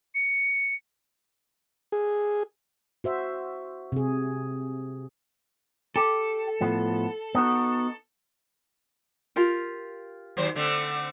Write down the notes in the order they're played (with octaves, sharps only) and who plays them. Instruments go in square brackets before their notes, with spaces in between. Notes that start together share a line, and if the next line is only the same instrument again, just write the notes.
[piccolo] C#7
[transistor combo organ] G#4
[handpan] F#4 C5 E5
C3 G#4
[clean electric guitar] G4 [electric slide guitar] A4
[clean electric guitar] A2 F3 B3
B3 D#4 F#4
[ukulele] F4 G4 A#4
[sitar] D#2 F#3 C5
D3 A3 C4